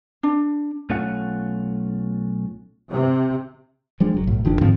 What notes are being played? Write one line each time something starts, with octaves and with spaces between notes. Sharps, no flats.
D4
B1 A3 C#4 F4 F#5
C3
F3 G3 G#3 D4
F#1 G2 F#3
B1 A2
F#1 D#3 F3 D4
G#2 D3 F3 C4